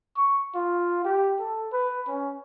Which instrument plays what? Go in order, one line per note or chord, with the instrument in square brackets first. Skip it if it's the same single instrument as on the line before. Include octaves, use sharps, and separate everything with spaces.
[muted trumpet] C#6
F4
G4
A4
B4
C#4